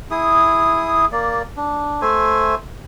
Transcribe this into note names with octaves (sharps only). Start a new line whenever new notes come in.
E4 G#4 D#6
A#3 D5
D4
A3 C5 E5 G#5